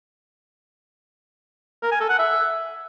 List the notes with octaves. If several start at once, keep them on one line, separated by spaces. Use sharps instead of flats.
A#4
G#5
A4
F#5
E5